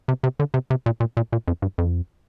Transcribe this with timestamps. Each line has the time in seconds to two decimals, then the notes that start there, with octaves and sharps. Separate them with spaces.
0.08 C3
0.23 C3
0.40 D3
0.54 C3
0.70 C3
0.86 A#2
1.00 A#2
1.17 A#2
1.33 A#2
1.48 F2
1.62 G2
1.78 F2